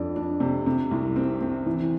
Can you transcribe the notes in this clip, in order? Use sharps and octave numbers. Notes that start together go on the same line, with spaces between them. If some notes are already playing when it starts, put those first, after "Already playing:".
Already playing: F2 D4
D4
C3
C3
C2
C4
C4
E3